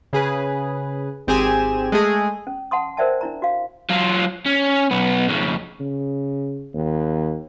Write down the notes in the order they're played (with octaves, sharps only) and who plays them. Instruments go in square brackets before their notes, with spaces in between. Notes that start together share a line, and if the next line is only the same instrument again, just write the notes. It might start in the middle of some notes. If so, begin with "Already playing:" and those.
[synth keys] C#3 G#4 B4
G#1 C4 G4 G#4 G#5 E7
G#3 A3 G#4
[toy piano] C#4
F#5 A5 C6 D#6
A#4 C5 D5 E5 G5 A5
D4 E4 A#5
F#4 F5
[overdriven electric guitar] F#3 F4
C#4
B1 B3
F2 C#3
[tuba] C#3
D#2